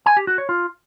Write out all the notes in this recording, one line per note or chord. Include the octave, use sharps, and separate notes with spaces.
G#5
G4
F#4
C#5
F4